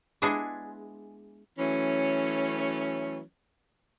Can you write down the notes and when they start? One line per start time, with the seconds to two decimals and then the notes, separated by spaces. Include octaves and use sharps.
0.22 G#3 B3 D4 E4 G#4
1.59 E3 F#3 A3 C#4